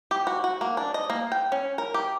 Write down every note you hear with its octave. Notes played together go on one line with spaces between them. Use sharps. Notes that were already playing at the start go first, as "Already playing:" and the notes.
G4
F#4
F#4
A#3
D4
D#5
A#3
G5
C#4
A#4
G4